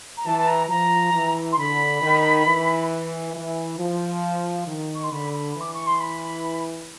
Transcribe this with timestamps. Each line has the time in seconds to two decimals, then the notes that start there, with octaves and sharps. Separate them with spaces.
0.17 A#5
0.26 E3 A5
0.38 A5
0.47 A#5
0.69 F3 A#5
1.14 E3
1.52 C6
1.57 D3 B5
2.01 D#3
2.46 E3
3.35 E3
3.78 F3
4.67 D#3
4.94 C#6
5.03 C6
5.11 D3 B5
5.33 B5
5.55 E3
5.60 D6
5.73 C#6
5.86 C6
6.00 B5